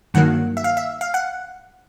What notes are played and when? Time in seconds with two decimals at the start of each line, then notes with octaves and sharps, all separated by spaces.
0.14 G2 D#3 F#3 A#3 F#5
0.57 E5
0.64 F5
0.77 E5
1.01 F5
1.14 F#5